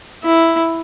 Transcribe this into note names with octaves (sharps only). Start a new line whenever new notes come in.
E4